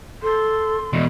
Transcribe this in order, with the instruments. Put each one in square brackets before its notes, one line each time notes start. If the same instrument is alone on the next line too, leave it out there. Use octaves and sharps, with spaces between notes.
[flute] A4 [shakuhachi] C6
[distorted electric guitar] E2 B2